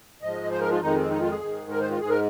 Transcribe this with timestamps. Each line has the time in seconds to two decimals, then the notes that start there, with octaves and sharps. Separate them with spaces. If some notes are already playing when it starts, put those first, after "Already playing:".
0.21 G#2 F3 G#3 D#5
0.51 C5
0.61 A#4
0.71 F4
0.81 F2 D#3 G#3 D#4
0.96 C4
1.10 D#4
1.21 F4
1.31 G#4
1.40 G#2 D#3 G#3
1.71 A#4
1.81 C5
1.90 F4
2.00 G#2 G#3 G#4
2.10 A#4